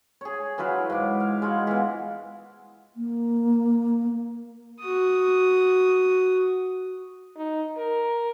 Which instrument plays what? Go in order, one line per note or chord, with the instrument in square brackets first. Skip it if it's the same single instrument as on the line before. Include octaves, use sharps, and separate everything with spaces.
[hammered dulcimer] G#4 C#5
E3 F#3 F4 B4
G#2 D6
F5
G#3 F4 F#4
E3 B3
[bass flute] A#3
[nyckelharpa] F#4 D#6
[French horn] D#4
A#4